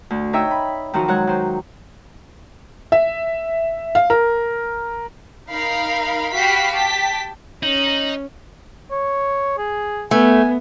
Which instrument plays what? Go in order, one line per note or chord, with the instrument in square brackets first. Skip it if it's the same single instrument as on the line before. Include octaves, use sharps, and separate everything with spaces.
[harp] D2
D#4 C#5 D#5 E5 G5 E6
B5
D#3 F3 F#3 D#4 F#4
F#3 G#3 C#5 F#5 F#6
D#3 C5
[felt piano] E5
F5
A#4
[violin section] D#4 A#4 F5 B5
F#4 G4 F5 G5 B5 B6
G4 G5 A5 B6
[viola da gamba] C#4 [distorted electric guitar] D#4 [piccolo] F#7
[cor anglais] C#5
G#4
[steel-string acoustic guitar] A3 [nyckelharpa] B3 [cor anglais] G#5